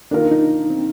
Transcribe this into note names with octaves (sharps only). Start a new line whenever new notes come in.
D#3 A#3 D4 F4 A#4
D#4
C4